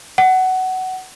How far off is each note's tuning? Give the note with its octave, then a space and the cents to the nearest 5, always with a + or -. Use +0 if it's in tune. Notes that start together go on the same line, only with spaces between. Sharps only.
F#5 +15